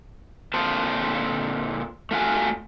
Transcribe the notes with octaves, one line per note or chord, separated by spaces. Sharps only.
A#2 D3 C4 C5 A5
A3 F4 F#4 G#5